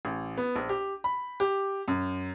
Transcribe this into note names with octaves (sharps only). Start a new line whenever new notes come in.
A1
B3
A#1
G4
B5
G4
F#2